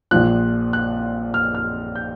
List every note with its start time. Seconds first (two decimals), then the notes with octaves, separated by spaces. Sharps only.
0.11 A#1 A#2 F3 F#6
0.73 F#6
1.34 F6
1.55 F6
1.96 G6